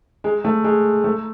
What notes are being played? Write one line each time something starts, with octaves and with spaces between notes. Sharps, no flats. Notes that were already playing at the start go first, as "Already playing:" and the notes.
G#3
A3
G#3
A3